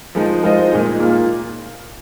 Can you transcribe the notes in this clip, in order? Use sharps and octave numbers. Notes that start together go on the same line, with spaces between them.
F3 G#3 D#4
G#3 F4 C5 D#5
A#2 G#3 D#4 G#4
A#2 A#3 F4